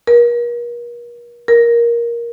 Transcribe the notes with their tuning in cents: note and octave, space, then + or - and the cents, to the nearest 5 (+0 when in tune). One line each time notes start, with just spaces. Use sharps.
A#4 +40
A#4 +10